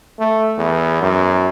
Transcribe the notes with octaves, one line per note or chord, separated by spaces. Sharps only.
A3
E2
F#2